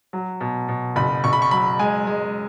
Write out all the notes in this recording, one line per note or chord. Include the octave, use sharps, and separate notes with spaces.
F#3
B2
B2
F#1 B5
F#1 C#6
B5
C#6
F#3 B5
G#3 G#5
G#3